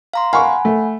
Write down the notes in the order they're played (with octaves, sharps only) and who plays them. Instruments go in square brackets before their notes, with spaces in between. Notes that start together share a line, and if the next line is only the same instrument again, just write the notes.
[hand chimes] F5 A#5 C6
[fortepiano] F5 C#6 [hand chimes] F#5 G#5 B5
[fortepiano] A3